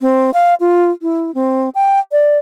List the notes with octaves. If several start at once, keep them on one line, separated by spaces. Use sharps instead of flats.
C4
F5
F4
E4
C4
G5
D5